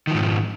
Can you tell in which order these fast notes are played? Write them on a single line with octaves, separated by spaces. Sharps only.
D#3 F3 G#2